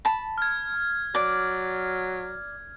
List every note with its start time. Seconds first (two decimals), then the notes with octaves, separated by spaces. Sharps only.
0.05 A5 B5
0.38 F6 G#6
1.15 F#3 D5